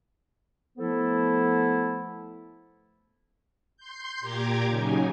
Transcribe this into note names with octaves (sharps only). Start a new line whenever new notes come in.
F3 A3 B3 E4 A4 C5
C6 G6
A#2 G4 A#5 D6 G#6
C#3 F#3 D#4 G#5